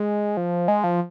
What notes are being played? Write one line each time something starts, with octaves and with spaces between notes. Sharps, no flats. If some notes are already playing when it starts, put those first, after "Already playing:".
Already playing: G#3
F3
G#3
F3